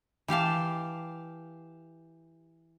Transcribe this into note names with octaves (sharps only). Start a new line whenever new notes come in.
E3 G4 F5 A5